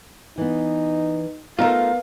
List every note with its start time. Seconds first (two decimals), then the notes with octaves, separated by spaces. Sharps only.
0.38 E3 B3 D#4
1.59 A3 B3 D#4 F4 A#4 F5